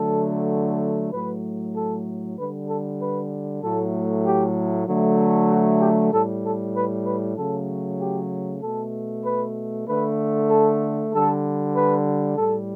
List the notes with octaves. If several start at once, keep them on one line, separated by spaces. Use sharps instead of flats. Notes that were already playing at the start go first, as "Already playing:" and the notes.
Already playing: D3 F#3 A3 A4
A2 F#3 A3 B4
A4
D3 G3 B4
A4
B4
A2 F#3 A3 A4
G4
D3 F#3 A3
F#4
G4
A2 G3 A4
A4
B4
B4
C#3 F#3 A3 A4
G4
B2 A4
A3
B4
D3 A3 B4
A4
D3 G3 A4
B4
A2 G3 A4